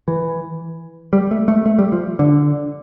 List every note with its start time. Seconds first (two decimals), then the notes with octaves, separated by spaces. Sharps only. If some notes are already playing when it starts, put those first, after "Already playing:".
0.08 E3
1.13 G3
1.31 A3
1.48 A3
1.66 A3
1.79 G3
1.92 F3
2.19 D3